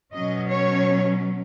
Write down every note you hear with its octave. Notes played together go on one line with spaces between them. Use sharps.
B2 F#3 C#4 D#5
C#5